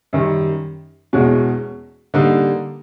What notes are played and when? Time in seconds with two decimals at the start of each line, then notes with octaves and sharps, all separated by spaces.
0.13 F#2 D#3 G3
1.13 E2 B2 G#3 C#4 F#4
2.14 D3 G3 A#3 D#4